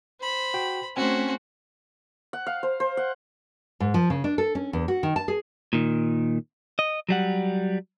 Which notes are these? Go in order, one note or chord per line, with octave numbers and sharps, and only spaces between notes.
C5 B5
F#4 G5
A3 C4 C#4 F#4 C5 G#5
F#5
F5
C5
C5
F#5
G#2
F3
C#3
D4
A4
C#4
E2
F#4
D#3
A5
G#4
A#2 D#3
D#5
F#3 G3 F#5